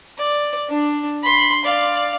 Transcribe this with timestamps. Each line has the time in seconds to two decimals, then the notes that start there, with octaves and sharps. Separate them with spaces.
0.18 D5
0.69 D4
1.23 B5 C6
1.65 D5 F5